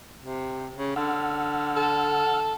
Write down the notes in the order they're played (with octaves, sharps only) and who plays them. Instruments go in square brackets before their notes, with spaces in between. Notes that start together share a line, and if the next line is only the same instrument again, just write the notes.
[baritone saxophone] C3
C#3
[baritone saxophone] D3 [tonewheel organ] F#5 E6 F6
[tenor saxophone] A4